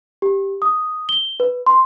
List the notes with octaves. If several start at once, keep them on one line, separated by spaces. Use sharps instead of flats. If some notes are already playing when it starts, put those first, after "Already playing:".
G4
D#6
G7
B4
C6